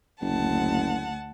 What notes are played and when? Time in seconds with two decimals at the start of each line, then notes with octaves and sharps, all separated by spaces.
0.21 F#1 D2 F#5 A5